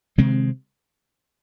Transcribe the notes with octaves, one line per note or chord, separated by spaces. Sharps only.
C3 D#3 G#3 C4